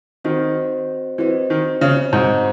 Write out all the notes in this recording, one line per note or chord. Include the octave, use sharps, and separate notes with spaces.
D#3 C4 F#4 C5 D#5
E3 C4 F#4 C5 D#5
D#3
C#3
G#2 C4 F#4 C5 D#5